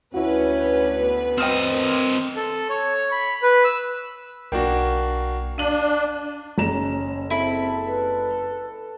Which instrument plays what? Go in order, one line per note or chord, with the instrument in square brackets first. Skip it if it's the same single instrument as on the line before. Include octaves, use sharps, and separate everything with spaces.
[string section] D2 B4 [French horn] C#4 [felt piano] E4 F#4
[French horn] B3
[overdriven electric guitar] C4 D#5 [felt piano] G5 D#6 F6
[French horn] A#4
[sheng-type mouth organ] A4
C#5
B5
B4
E6
[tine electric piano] B1 G5 [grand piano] A#3 D4 F#4
[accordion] D4 [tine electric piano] F5 [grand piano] D#7 F#7
[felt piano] F#1 A#5 E7 [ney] C#4
[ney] C4 [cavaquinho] E4 B5 [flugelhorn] A4
[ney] B4